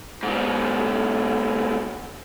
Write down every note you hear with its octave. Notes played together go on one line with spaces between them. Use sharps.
G#2 B2